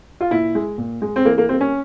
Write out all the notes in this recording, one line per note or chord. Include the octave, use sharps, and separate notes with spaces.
F4
A#2 E4
G#3
A#2
G#3
C4
E3 A#3
A#3
G3 A#3 C4
C#4